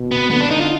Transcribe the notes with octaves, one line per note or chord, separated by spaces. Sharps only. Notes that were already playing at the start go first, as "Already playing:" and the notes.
Already playing: B2
B3
D3 B3
D4
D#4
F4